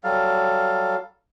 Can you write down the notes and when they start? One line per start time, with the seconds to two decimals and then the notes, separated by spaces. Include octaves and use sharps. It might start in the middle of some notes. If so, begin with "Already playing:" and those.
0.04 F#3 G3 A4 F5